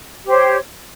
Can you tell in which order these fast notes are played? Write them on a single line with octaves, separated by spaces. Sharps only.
G4 C5 C#5